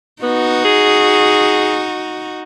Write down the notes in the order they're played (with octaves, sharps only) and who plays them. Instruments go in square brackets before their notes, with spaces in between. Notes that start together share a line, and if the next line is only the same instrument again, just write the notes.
[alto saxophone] B3 [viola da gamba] D#4 F#4
[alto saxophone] G#4